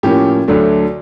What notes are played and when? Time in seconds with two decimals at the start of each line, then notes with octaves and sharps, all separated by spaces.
0.03 A2 F3 A#3 C#4 G4
0.48 D2 D3 F#3 A3 D4